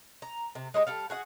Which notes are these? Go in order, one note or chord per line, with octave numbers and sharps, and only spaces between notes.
A#5
C3
G#3 D#4 E4 G4
G3 A4 F5
F#4 G#4 F5 F#5